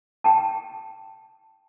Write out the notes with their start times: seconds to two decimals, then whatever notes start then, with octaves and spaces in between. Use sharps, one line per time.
0.24 G5 A5